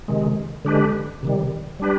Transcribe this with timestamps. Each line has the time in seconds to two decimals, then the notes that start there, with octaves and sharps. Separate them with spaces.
0.08 C3 D#3 G#3
0.65 D3 G#3 D4 G4 B4
1.23 C3 D#3 G3
1.80 G3 D4 G4 B4